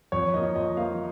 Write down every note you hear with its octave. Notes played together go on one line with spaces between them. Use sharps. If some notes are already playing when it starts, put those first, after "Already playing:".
F2 C#5
F3 A#3 D#5
F2 D#5
F3 A#3 F5